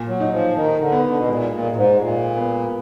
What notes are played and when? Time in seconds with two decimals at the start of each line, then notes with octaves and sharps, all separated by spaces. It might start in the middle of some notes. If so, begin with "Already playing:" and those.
Already playing: A#2
0.08 F#3
0.20 D#4
0.32 F3
0.56 D#3 D#4
0.80 D3
0.92 B3
1.07 D3
1.18 B2
1.28 A#2 G#3
1.52 A#2
1.64 G#3
1.72 A#2
1.76 G#2
2.00 A#2 G#3
2.37 B3